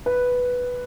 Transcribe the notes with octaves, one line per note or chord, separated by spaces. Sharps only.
B4